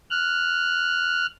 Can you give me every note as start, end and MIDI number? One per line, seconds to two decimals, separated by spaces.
0.10 1.26 89
0.10 1.26 90